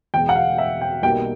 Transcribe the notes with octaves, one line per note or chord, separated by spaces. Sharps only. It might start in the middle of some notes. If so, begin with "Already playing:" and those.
E2 B2 G#3 G5
F#5
F5
E5
G5
B1 B2 G3 A#3 G5